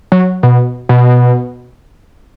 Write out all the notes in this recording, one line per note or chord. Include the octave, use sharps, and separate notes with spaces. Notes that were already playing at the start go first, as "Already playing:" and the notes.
F#3
B2
B2